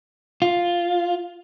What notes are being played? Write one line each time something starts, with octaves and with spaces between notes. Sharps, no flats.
F4